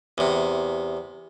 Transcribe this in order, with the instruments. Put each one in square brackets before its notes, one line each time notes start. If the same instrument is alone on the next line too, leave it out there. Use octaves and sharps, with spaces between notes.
[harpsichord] E2 C3